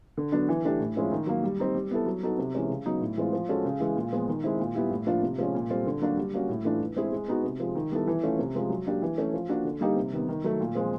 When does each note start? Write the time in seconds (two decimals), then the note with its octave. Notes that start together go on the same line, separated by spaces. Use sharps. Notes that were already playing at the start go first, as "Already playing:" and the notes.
0.17 D3
0.32 F#3 B3 D4
0.49 E3
0.65 A3 D4 G4
0.80 A2
0.96 F3 G#3 C#4 E4
1.11 D#3
1.27 F#3 A#3
1.43 G3
1.60 C4 D#4
1.75 G3
1.91 B3 E4 A4
2.06 F#3
2.23 B3 D#4 F#4 A4
2.39 C3
2.55 E3 G#3 C#4
2.70 C#3
2.86 F#3 B3 D#4
3.01 A2
3.17 E3 G#3 C4 F4
3.33 F3
3.49 G#3 C#4 F#4 A4
3.65 C#3
3.80 E3 G#3
3.96 A#2
4.12 F3 G#3 B3
4.28 D#3
4.44 G#3 C4 E4
4.59 A#2
4.75 G3 B3 E4 G4
4.90 A2
5.07 F3 A#3 D4 F4
5.23 C3
5.38 F3 G#3 C#4
5.55 A#2
5.70 G3 C4 F4 A4
5.86 D3
6.01 F#3 A#3 D4 F#4
6.17 G3
6.34 A#3 C#4 F#4
6.49 A2
6.65 E3 A3 D4 F4
6.81 E3
6.96 G#3 C4 E4 G#4
7.12 G#3
7.28 B3 D#4 F#4
7.44 C3
7.60 F3 G#3
7.75 D#3
7.92 G3 B3 E4 A4
8.07 E3
8.23 A3 C#4 F4
8.39 C3
8.55 F3 G#3
8.70 F#3
8.86 A#3 D4 G4
9.02 E3
9.18 A3 C#4
9.34 F3
9.49 A#3 D4 F#4
9.65 D3
9.81 G3 A#3 D#4 G4
9.96 C3
10.13 D#3 G3 B3
10.29 D#3
10.44 F#3 A3
10.60 A#2
10.75 F3 G#3 C4